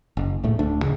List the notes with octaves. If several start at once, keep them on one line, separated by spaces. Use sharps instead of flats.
F#1
A#1 A2 A3
D1 D2 A3 D4
D1 A#2 C#3